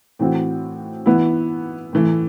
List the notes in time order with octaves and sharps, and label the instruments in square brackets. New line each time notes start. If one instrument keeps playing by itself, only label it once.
[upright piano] A2 E3 A3 C4 F#4
E3 B3 E4
A2 E3 A3